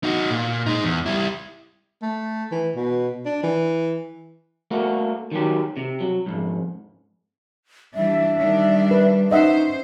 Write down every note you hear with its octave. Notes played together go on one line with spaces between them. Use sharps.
D#4 F#4
A#2
G#3 D#4
E2
G3 E4
A3
E3
B2
D4
E3
A3 A#3 F#4
D#3 F#3 G4
C3
F#3
C2 F2 G#2
E3 G3 D4 E5
D#3 G3 D4
B4
C#4 D#4 C5 D#5 E5 F#5